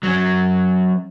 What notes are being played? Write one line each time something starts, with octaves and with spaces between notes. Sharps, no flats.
F#3 C#4